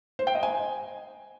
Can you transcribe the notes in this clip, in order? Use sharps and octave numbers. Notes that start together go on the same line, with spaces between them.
C5
G5
D#5
G#5